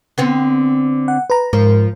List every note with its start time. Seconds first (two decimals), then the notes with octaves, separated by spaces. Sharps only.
0.18 D3 B3 C4
1.08 F#5
1.30 B4 A#5
1.53 G#2 F3 A#4